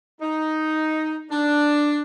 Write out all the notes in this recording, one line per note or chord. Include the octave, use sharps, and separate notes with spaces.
D#4
D4